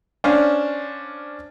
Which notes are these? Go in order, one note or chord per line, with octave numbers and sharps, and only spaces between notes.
C#4 D4 C5 F5